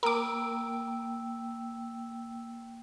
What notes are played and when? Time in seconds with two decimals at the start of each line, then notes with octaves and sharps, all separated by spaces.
0.03 A#3 A#4 G5 D6 E6